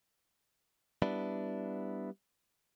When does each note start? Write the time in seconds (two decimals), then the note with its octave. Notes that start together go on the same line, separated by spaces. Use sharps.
1.02 G3 B3 D4 E4